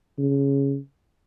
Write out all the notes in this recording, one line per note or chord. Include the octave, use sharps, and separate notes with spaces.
C#3